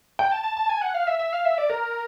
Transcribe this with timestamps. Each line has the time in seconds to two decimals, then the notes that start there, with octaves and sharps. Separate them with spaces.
0.19 G5
0.32 A5
0.44 A5
0.57 A5
0.69 G#5
0.82 F#5
0.94 F5
1.07 E5
1.19 E5
1.33 F5
1.45 E5
1.58 D5
1.70 A#4